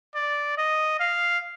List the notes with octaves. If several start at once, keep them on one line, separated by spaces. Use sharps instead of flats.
D5
D#5
F5